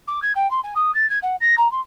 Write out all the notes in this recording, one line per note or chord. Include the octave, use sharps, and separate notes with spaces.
D6
G#6
G5
C6
G#5
D#6
A6
G#6
F#5
A#6
A#5
C6